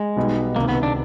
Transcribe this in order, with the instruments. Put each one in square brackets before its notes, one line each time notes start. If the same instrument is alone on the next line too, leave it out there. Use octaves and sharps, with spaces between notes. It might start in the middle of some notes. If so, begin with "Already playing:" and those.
Already playing: [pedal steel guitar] G#3
[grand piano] B1 B2 G3 B3 D#4
[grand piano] C#2 C3 D#3 [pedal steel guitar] A#3
[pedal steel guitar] B3
D4